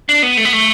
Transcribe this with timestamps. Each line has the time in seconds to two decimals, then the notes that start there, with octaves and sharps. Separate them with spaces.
0.09 D4
0.23 B3
0.37 A3
0.45 B3
0.53 A3